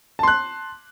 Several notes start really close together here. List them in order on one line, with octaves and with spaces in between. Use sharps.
A5 C6 F#6